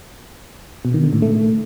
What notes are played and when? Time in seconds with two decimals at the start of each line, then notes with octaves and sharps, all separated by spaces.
0.85 B2
0.94 D#3
1.03 D3
1.13 A2
1.22 A3